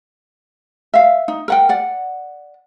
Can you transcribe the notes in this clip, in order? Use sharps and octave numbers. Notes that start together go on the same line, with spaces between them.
E5 F5
D#4
A#4 F#5 G5
D5 F#5